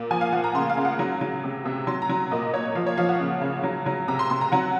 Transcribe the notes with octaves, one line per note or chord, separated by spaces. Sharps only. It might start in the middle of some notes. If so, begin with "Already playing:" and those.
Already playing: A#2
F3 G#5
F5
F3 F#5
A#5
C#3 C6
F5
C#3
F#5
F#3
F#3
C3
C3
F#3 C6
A#5
F#3
A#2 D#5
A#2 C#5
F3 F5
C#5
F3 F5
F#5
C#3
C#3
F#3
F#3
C3 A#5
C6
C3 C6
A#5
F#3 F#5